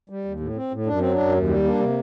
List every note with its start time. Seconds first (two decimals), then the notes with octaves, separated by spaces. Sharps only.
0.09 G3
0.25 D#2
0.40 A2
0.55 C4
0.72 A2
0.86 F#2 D4
0.99 F#3 C4
1.13 F#2 D4
1.33 D#2
1.48 G3
1.64 A#3 D4
1.79 C3 C4